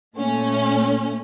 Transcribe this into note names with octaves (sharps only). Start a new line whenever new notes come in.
A#2 A3 C#4